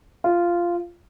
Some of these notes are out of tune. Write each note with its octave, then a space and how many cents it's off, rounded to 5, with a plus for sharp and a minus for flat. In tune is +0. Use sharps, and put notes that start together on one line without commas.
F4 -10